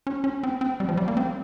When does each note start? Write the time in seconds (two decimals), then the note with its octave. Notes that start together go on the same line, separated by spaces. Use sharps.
0.07 C#4
0.24 C#4
0.43 C4
0.61 C4
0.80 G3
0.89 F3
0.97 G3
1.08 A#3
1.17 C4